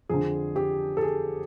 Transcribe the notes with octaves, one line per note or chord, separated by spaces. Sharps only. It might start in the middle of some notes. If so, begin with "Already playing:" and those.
F2 D3 G#4
G4
A4
G#4